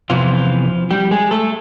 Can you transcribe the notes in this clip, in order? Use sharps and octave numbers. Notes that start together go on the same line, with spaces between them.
E2 C3 E3 F3 F4
G3 G4
G#3 G#4
A3 A4